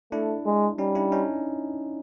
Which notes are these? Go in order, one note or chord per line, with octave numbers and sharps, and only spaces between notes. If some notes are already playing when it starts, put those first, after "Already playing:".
A3 D4 E4
G#3
G3 C#4 D#4
D4 E4
C#4 D#4